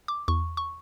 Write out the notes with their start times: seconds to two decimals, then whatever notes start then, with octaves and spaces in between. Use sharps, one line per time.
0.08 D6
0.28 E2 C#6
0.57 C#6